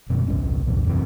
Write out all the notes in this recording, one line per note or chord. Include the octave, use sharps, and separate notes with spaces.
F#1 F#2 B2 G#3
G1 C2 C#4
A#1 E2 A#2
F#2 C3 E3 C4